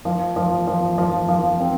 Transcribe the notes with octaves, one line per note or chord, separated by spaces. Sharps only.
F3
F3
F3
F3
F3
C4